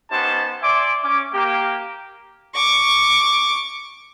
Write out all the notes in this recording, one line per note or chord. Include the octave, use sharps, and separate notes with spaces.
B3 C#4 D#4 G4 C5 A5
D5 E5 G#5 C6 D6
C#4 D6
A#3 G4
C#6 D6